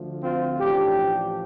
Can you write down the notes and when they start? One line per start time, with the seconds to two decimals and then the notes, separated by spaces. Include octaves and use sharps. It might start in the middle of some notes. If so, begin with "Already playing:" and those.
Already playing: D2 D3 F3 A3
0.22 C4 F4
0.59 A1 A2 F3 D4 G4